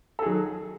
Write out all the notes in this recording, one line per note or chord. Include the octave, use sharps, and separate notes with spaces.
A4
D#3 F#3 G#4